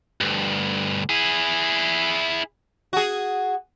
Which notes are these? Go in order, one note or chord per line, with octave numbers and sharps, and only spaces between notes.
D2 G2
E4 G#4
F#4 G#4